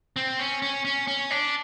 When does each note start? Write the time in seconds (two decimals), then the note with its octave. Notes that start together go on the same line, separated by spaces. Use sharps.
0.16 C4
0.40 C#4
0.62 C#4
0.85 C#4
1.07 C#4
1.31 D4